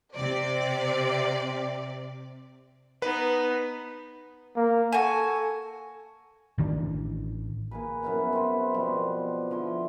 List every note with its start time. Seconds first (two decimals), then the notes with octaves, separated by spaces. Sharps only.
0.14 C3 D5
3.02 B3 D#4 B4
4.56 A#3
4.92 F#4 A4 G#5
6.58 A1 D#3 G3 D4
7.71 A#3 G#4 B4
8.03 F#2 B3 E4 F5
8.33 C4 B4
8.74 B2 F3 G3 F#4
9.50 D3 F3 E4 C6